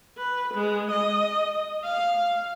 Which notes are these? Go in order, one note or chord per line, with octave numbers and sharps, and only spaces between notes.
B4
G#3
D#5
F5